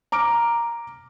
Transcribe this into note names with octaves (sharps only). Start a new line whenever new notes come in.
A#5 D6 F6 D7